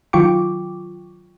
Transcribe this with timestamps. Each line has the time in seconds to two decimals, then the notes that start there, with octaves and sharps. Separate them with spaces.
0.13 D#3 F#3 F4 G5 C#6 D6